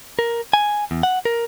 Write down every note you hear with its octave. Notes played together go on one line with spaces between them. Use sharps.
A#4
G#5
E2
F#5
A#4